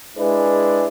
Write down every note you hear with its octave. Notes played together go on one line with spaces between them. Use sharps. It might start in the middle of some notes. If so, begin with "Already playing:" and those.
G#3 D4 E4 G#4 B4